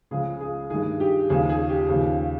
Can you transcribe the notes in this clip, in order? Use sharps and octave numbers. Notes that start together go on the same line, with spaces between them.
C#2 C#3 F3 G#4
G#4
G2 D#3 G#4
G4
D#2 C#3 F3 G#4
G#4
G4
D#2 C#3 F3